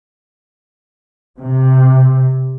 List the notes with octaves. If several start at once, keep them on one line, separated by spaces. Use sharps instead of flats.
C3